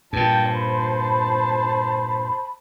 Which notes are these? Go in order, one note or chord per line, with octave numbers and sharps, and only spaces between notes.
G2 A#2 G5 A5
C5 A5 B5